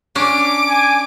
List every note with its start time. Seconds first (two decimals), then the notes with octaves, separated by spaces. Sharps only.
0.15 C#4 D4 D6
0.69 G#5